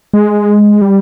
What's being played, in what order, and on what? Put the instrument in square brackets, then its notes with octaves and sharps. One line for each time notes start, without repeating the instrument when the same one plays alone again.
[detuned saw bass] G#3
G3